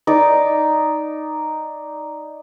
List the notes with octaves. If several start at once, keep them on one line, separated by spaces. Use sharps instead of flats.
D#4 D5